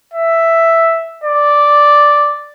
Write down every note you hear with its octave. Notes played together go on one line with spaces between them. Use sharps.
E5
D5